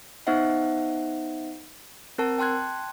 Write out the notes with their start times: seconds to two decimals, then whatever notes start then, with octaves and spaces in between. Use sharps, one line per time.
0.27 B3 D#4 C5 E5 F#5
2.18 C4 A#4 A5
2.38 G5 A5 C6 F#6 G#6